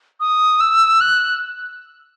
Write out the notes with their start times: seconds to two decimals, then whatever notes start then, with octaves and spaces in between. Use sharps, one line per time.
0.20 D#6
0.60 E6
1.01 F#6